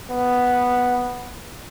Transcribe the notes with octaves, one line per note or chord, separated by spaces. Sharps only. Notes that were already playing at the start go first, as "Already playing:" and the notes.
B3